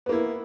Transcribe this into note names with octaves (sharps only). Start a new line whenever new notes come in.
A#3 B3 E4